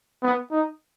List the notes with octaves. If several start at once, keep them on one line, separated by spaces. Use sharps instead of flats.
B3
D#4